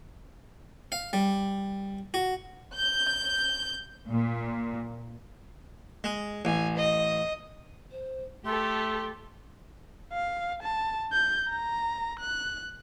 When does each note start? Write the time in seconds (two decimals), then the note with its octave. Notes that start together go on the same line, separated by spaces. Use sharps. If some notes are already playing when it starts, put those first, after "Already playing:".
0.92 F5
1.13 G3
2.14 F#4
2.75 G6
4.08 A#2
6.04 G#3
6.45 A1 G#5
6.76 D#5
7.92 C5
8.45 A3 G4 A4 C6
10.13 F5
10.63 A5
11.12 G6
11.50 A#5
12.20 F#6